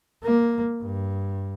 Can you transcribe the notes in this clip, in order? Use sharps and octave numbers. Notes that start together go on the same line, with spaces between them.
A#3
G2